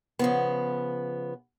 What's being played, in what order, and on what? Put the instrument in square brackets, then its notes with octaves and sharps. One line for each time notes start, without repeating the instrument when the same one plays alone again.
[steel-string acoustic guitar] C#3 F3 B3